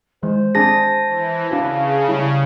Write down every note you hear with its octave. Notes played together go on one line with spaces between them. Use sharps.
D#3 E3 G#3 C5
C4 D4 G#4 A5 A#6
E3
C#3 D4 F#4 F5
G3 E4